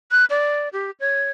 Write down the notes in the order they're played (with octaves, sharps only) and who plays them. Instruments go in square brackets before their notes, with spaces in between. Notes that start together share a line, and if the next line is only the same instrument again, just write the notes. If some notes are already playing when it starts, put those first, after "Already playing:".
[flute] F#6
D5
G4
C#5